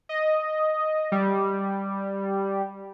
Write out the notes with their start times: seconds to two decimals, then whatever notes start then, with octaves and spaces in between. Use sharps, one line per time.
0.09 D#5
1.12 G3